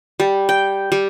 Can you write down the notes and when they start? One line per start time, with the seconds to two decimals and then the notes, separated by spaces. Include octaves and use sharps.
0.20 G3
0.49 G5
0.92 G3